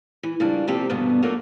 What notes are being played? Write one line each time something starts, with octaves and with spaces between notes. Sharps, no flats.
E3
C#3 F3 G3 A#3 D4
C3 F3 A#3 C4 G4 A4
E2 G2 B2 D3 B3
F#3 A3 A#3 D4 F4 F#4